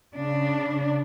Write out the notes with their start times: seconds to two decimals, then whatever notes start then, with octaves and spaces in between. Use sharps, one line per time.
0.14 C#3 D4